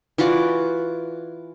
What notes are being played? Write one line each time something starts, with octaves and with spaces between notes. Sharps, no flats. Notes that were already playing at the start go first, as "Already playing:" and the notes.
E3 F4 F#4 D5